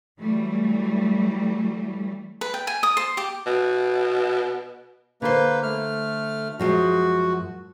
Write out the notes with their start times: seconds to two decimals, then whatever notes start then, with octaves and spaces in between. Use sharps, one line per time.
0.21 E3 F#3 G3 A3
2.41 B4
2.54 G5
2.67 G#5
2.83 D#6
2.97 C5
3.17 G4
3.46 B2
5.22 D3 A#3 B4 C5
5.63 A3 F6
6.59 F#2 F3 G#3 F#4